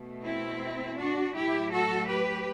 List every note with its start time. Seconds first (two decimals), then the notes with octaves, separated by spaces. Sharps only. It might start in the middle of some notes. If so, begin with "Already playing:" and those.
Already playing: B2 A3
0.24 C4 E4
0.97 D4 F#4
1.34 A2 F#3 A3 E4 G4
1.71 F#4 A4
2.07 G4 B4